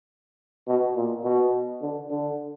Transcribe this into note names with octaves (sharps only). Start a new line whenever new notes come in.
B2
A#2
B2
D3
D3